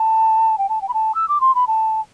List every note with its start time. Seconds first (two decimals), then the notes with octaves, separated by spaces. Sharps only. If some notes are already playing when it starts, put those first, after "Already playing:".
Already playing: A5
0.58 G5
0.69 A5
0.81 G5
0.89 B5
0.94 A5
1.15 E6
1.29 D6
1.41 C6
1.55 B5
1.67 A5